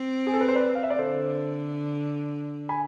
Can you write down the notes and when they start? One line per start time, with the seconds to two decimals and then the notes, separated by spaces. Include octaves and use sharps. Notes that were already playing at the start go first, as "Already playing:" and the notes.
Already playing: C4
0.27 G#4
0.34 A4
0.41 B4
0.48 C5
0.55 B4 D5
0.75 F5
0.83 E5
0.90 D5
0.99 D3 A4 C5
2.69 G#5 B5